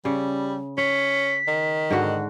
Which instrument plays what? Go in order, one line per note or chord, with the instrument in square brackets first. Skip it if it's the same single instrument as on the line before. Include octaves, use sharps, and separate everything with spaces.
[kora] C#3 [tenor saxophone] G3
[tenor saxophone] C#4 [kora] C#5 [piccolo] B6
[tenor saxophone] D#3
[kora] G#2 D3 F#4